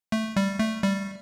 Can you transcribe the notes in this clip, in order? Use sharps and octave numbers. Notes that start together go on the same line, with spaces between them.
A3
G3
A3
G3